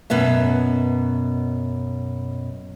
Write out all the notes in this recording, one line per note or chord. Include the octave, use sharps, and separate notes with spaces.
F#2 B2 B3 E5